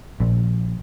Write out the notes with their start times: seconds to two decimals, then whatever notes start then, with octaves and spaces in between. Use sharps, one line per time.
0.20 A#1